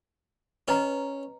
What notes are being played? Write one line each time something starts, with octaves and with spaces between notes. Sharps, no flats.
C#4 B4 D#5 A#5